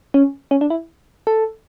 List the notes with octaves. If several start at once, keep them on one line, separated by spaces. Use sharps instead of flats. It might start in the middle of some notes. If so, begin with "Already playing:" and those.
C#4
C#4
D4
E4
A4